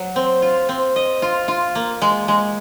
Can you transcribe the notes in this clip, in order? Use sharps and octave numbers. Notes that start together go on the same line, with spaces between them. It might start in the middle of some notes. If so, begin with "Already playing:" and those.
Already playing: F#3
C4
F4
C4
D#5
F4
F4
A#3
G#3
G#3